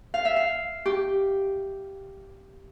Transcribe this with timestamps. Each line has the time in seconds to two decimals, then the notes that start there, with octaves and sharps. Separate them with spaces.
0.14 F5
0.25 E5
0.36 F5
0.86 G4